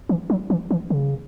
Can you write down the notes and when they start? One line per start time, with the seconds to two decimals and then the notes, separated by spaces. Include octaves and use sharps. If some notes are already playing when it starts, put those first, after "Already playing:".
0.09 E3
0.30 F#3
0.50 E3
0.71 E3
0.90 C#3